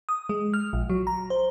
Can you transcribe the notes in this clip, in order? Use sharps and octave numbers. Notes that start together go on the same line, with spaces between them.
D#6
G#3
F6
A#1
F#3
A#5
C5